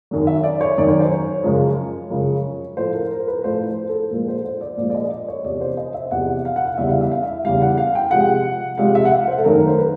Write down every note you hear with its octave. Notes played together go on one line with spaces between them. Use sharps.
F#2 D#3 F#3
E5
D5
C#5
F#2 D#3 F#3 D5
C#5
C5
C#5
F#2 C#3 F3 G#3
F#2 C#3 F3 G#3
A2 F3 A3 C5
A#4
A#4
B4
A2 F3 A3 C5
C5
A4
A#2 F3 G#3 A#4
C5
C5
D5
A#2 F3 G#3 D5
D5
D#5
D5
C#5
E2 C3 F3 D5
C5
D#5
E5
E2 C3 F3 F#5
F5
F#5
F5
E2 C#3 E3 G3 E5
F5
E5
F5
E5
E2 C#3 E3 G3 F5
F#5
F5
G5
C3 F3 G#3 F#5
C3 F3 G#3 F5
E5
F#5
F5
C5
A4
F#2 D#3 F#3 A3 A#4
C5
B4